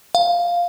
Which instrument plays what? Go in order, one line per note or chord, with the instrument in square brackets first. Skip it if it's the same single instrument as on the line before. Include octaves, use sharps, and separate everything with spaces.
[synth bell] F5